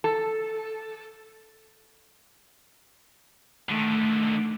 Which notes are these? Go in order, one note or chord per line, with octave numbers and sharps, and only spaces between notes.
A4
D3 D#3 A3